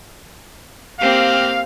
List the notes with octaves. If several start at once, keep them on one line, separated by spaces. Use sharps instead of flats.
A#3 C4 G4 F5